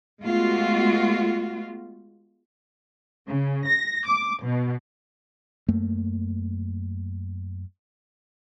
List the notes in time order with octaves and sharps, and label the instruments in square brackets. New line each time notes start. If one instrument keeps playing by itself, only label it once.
[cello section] G#3 A3 B3 F4 F#4
[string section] C#3
A#6
D6
B2
[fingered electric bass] F#2 A3 A#3